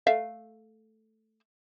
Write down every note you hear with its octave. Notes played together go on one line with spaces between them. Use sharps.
A3 E5 F5